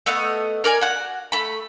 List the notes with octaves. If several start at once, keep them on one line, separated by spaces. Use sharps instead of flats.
A3 B3 D#5 F#5
A#4 D5 F#5 G#5
F#4 F#5
A3 B5